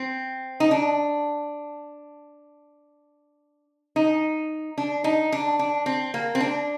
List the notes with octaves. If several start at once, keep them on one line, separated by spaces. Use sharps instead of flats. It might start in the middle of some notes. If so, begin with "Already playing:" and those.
Already playing: C4
D#4
D4
D#4
D4
D#4
D4
D4
C4
A#3
C4
D4